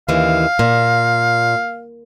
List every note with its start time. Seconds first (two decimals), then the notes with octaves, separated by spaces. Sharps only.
0.09 D#2 C#3 E3 F5
0.59 A#2